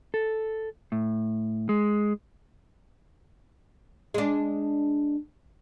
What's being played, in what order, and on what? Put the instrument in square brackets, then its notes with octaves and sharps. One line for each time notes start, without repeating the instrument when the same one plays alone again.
[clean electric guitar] A4
A2
G#3
[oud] G#3 D4